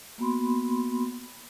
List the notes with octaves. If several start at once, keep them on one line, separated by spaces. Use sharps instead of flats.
A#3 B3 F#4 B5 C6